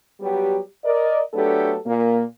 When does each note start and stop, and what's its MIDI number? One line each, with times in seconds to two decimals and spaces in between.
0.21 0.59 54
0.21 0.59 55
0.21 0.59 59
0.21 0.59 67
0.85 1.21 70
0.85 1.21 74
0.85 1.21 75
1.34 1.75 54
1.34 1.75 57
1.34 1.75 59
1.34 1.75 62
1.34 1.75 67
1.34 1.75 69
1.86 2.23 46
1.86 2.23 58